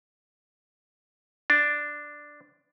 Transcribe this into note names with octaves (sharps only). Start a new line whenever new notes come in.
D4